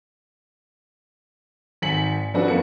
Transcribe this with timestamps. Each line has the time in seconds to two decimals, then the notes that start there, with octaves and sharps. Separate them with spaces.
1.82 G#1 D#3 G#5 B6 C#7 F#7
2.34 F3 C#4 D4 F#4 A4 B4
2.48 F2 A#3 C#7